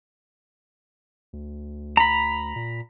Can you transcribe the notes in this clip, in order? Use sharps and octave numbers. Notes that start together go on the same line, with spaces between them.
D2
A#5 B5
A#2